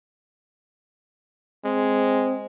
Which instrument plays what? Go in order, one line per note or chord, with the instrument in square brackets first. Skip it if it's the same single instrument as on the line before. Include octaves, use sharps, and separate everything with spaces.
[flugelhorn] G#3 [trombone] C4